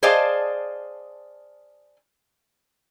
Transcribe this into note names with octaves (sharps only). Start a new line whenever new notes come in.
G#4 C5 D5 D#5 F5 A5